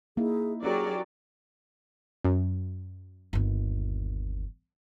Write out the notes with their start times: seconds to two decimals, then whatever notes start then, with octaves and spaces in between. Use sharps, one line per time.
0.17 A#3 D#4 E4 G#4
0.63 F#3 C#4 G4 G#4 A#4 D5
2.24 F#2
3.33 G1 D#2